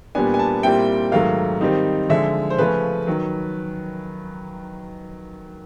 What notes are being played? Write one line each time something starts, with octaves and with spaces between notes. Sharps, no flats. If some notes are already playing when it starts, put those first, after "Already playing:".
A#2 G3 B3 D4 G#5
G#5
A5
A#2 G3 C4 E4 G5
G#2 D#3 F#3 A3 F5
D#3 G3 C4 D#4
D3 F3 G#3 E5
C5
C#3 F3 A3 C#4 B4
D#3 F#3